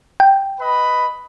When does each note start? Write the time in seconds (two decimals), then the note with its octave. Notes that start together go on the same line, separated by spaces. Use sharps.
0.20 G5
0.60 B4 D#5 B5